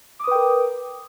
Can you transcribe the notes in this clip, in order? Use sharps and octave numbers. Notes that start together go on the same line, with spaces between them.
A#4 B4 G5 D6 D#6